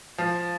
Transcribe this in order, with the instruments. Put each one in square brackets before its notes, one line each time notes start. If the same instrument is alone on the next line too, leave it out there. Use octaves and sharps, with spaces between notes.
[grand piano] F3